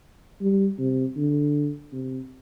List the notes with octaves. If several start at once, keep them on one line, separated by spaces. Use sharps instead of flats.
G3
C3
D3
C3